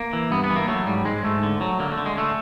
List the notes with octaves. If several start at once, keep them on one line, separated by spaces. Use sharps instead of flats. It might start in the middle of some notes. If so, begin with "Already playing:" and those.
Already playing: A#3
E3
G2 B3
B3
E3
A#3
F#3 A3
G#2 G3
G#2 G#3
G#2 A3
D3
F#3
D3 A#3
A3
D3
G#3
D3 A3